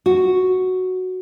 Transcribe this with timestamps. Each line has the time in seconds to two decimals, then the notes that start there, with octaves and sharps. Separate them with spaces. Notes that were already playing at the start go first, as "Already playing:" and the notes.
0.06 F#4